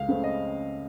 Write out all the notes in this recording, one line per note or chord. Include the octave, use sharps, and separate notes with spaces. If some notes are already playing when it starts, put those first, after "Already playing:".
Already playing: C#2 F5
C#3 A3 C4
D#5